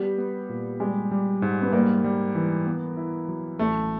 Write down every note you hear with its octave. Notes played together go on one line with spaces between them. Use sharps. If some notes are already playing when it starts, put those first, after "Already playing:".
Already playing: G3 B3
B3
A#2
G3 G#3
G3
G#2
B3
G3 A#3
G3
E3
B3
E4
F#3
A1 A3